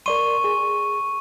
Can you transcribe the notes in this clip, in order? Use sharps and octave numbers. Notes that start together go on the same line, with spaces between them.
A#4 D5 C6 C#6 D#7
G#4